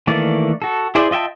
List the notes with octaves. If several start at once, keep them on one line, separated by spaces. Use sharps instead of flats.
D#3 E3 A3 A#3 D5
F#4 A4
E4 G#4 C5 D5 E5
F4 D#5 E5 G5 A5